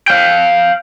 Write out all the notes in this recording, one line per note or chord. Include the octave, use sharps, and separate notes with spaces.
F5 G5